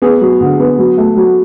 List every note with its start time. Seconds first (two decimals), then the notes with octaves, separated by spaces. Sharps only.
0.02 B3 G#4
0.21 F#3
0.41 D3
0.60 B3
0.79 F#3
0.98 A3
1.17 F#3